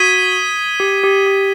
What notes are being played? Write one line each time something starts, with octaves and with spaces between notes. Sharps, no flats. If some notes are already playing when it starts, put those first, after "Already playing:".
Already playing: F#4 D#6 G#6 B6 D#7 G7
G4
G4
G4